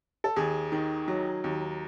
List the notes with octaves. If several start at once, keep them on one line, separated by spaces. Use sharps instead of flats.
A4
D#2 G#4
D#3
F#3
D#2